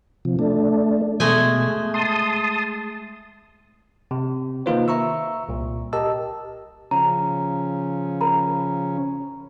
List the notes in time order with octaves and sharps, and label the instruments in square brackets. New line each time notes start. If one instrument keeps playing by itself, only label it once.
[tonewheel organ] C3 F3
A3 D4
[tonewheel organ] B2 [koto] G#3 A3 G#5
[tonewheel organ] A5 C6 D#6
[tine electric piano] C3
D#3 A#3 D#4 F4 B4 C5
E5 A#5 C#6 E6
C2 A#2
G4 A#4 D#5 A5 E6
[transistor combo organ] C#3 F3 C#4 [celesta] A#5
[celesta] A#4 A#5 B5